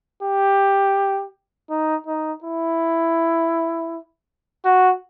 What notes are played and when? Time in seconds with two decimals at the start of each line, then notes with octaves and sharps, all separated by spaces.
0.22 G4
1.70 D#4
2.07 D#4
2.43 E4
4.65 F#4